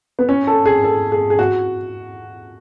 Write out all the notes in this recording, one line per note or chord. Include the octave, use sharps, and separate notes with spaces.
B3
C#4
A4
G#4
A4
G#4
G#4
F#4